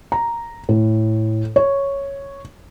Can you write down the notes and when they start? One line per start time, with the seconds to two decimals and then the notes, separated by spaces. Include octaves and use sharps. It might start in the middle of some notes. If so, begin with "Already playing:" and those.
0.12 A#5
0.69 A2
1.56 C#5